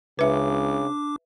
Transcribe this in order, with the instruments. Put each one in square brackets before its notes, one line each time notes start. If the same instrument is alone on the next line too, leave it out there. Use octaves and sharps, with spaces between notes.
[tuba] C#2 [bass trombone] C#3 [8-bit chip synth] D4 D6 [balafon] B4 E5